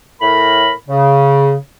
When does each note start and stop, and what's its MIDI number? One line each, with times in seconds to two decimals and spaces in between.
0.21 0.72 45
0.21 0.72 70
0.21 0.72 83
0.89 1.56 49